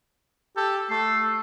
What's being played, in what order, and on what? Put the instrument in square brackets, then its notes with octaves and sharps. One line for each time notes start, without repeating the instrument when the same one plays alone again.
[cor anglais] G4 [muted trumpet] A4
[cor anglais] A3 [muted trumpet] A4 [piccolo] C7